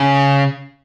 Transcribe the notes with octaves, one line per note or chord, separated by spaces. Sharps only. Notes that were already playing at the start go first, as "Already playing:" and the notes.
Already playing: C#3